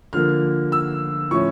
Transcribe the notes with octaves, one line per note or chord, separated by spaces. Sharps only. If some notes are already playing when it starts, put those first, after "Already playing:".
D3 F3 A#3 F6
E6
A2 F3 C#4 C#6